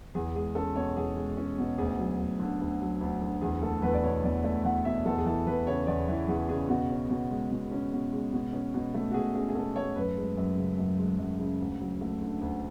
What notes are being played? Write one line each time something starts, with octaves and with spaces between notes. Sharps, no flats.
E2 G#4
G#3 G#4
C#4 A4
B2 C#5
E2 G#4
G#3
C#4
B2
D2 G#4
F#3
D2
D3
D2
F#3
D2
D3
E2 G#4
A3 A4
E2 B4
D5
B2 C#5
E2 D5
A3 D5
E2 F#5
B2 E5
E2 A4
G#4
E3 A4
E2 B4
C#3 C#5
E2 D5
E3
E2 G#4
C#3 G#4
B2 F#4
C#4
B2
G#3
B2
C#4
B2
G#3
B2
C#4
B2
A3
F#4
B2 G#4
C#4 G#4
G#4
B2 A4
A3 C#5
F#2 B4
G#3
F#2
C#3
F#2
G#3
F#2
C#3
D2
F#3
A3
D3
D2